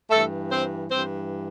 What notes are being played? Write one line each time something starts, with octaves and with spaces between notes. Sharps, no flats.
G2 E3 A3 A4
C4 C5
G2 E3 C4 C5